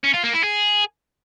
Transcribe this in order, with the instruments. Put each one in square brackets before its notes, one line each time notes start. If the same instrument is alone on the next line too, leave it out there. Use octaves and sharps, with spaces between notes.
[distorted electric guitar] C#4
F4
A#3
E4
G#4